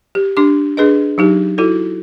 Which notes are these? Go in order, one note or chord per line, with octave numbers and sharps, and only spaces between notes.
G4
D4 G4 D6
D4 G#4 B4 D#5
F#3 D#4 G4
E4 F#4 A4